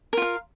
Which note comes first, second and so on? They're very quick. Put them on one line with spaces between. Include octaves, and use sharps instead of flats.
A#4 F4 F5